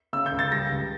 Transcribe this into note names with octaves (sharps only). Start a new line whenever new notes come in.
C#3 E6
G6
C#2
A6
G3 A#6
C#2